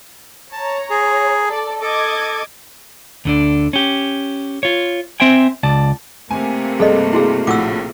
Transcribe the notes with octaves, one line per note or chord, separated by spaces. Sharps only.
C#5 A5 A#5
G#4
A4 D5
A4 D#5 D6 G#6
D2 D3 D4
C#4 G4
F4 C#5
C4 C5 E5 G5 G#5
C#2 D5 A5
C3 A3 A#3 G#5
G2 G#4 A4 D#5
E4 F#4 G#4
A#1 A2 F#4 D6 E6